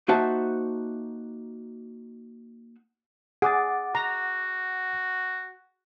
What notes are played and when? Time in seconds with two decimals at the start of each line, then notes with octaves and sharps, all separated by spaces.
0.08 A#3 D#4 F#4 C5 E5 A5
3.42 G#4 F#5 D6 A6
3.95 F#4 A#5